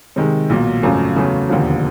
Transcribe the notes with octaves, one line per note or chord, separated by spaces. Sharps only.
C3 D#3 G#3
B1 A#2 F#3
G#1 F#2 C#3 F3 A3
E2 C#3 F#3 A3 C#4
E1 D#2 D3 F3